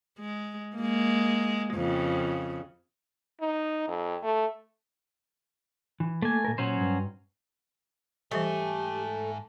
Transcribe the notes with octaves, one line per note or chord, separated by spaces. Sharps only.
G#3
G#3 A#3
F2 C#3
D#4
F2
A3
E3
A3 A#3 G#5
A#2 A#4
A#2 F#3 C#4 C5
G2
G#2 E3 G3 A3 G4 D#5 G#5